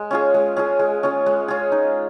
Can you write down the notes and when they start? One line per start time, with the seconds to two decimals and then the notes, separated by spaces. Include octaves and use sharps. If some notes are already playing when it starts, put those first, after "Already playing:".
Already playing: G#3
0.11 C#4 F4 G#4
0.34 G#3
0.56 C#4 F4 G#4
0.79 G#3
1.03 C#4 F4 G#4
1.26 G#3
1.48 C#4 F4 G#4
1.72 D#4